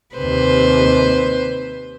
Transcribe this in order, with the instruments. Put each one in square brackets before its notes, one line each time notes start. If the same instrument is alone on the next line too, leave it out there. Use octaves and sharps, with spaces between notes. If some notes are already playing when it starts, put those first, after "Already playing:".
[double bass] D#2 C3 [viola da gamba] B4 C5